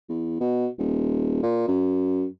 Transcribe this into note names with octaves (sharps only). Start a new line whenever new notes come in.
E2
B2
D#1
A#2
F#2